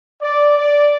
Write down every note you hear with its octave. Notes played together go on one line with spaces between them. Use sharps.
D5
D5